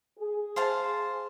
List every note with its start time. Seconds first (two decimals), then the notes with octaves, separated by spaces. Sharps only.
0.20 G#4
0.56 C5 F5 A5